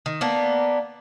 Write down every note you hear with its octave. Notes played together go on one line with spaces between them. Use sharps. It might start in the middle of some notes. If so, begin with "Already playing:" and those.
D#3
A#3 B3 D4